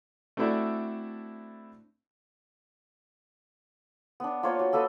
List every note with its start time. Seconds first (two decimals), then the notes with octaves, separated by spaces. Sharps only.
0.37 A3 C4 D4 E4 F#4 A4
4.20 B3 D4
4.43 A#3 F4 C5 C#5
4.59 F#4
4.73 A#3 A4 B4 D#5